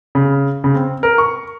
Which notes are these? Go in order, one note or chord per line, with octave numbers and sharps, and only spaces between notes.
C#3
C#3
C4
A#4
C#6